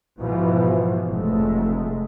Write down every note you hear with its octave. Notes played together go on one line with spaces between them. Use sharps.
G#2 B2 E3 F3
F1 G#3 A3